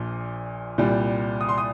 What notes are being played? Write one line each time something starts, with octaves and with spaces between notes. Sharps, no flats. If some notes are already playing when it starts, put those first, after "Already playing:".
Already playing: A#1 A#2 F3
C2 A#2 G3
D#6
C6
D#6